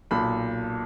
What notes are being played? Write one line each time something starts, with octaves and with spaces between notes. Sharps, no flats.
B1 A#2 B5